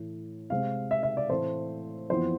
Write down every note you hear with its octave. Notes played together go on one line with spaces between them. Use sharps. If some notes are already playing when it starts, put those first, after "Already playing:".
Already playing: A2 E3 A3
C3 G#3 C4 F5
E5
E5
D5
A2 E3 A3 C4 C5
F2 E3 B3 C5